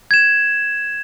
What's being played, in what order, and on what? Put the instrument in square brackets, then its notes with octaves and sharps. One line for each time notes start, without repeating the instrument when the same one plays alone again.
[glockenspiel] G#6 E7